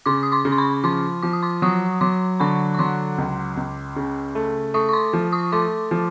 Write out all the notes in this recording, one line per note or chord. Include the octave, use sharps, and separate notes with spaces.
C#3 C6 D6
D#6
C6 D6
C#3
C6
B5 C#6
F3 C6 D6
F3 D6
D#6
C6 D6
F#3 C#6 D#6
F#3 C6 D6
D3 B5 C#6
C#6
F#3 C6 D6
C#2
C#2
C#3
A3
A3 C#6 D#6
C#6
C6 D6
F3
C#6 D#6
A3 C6 D6
F3